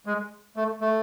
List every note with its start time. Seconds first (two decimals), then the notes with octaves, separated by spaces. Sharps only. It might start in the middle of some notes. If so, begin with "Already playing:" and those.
0.06 G#3
0.56 A3
0.81 A3